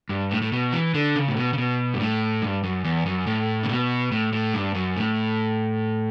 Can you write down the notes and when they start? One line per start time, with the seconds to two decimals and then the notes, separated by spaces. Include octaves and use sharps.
0.09 G2
0.31 A2
0.42 A2
0.52 B2
0.72 E3
0.94 D3
1.16 C#3
1.28 A2
1.37 B2
1.53 C#3
1.58 B2
1.94 G2
2.00 A2
2.42 G2
2.64 F#2
2.84 E2
3.06 F#2
3.27 A2
3.63 C#3
3.69 B2
4.12 A2
4.33 A2
4.54 G2
4.75 F#2
4.97 A2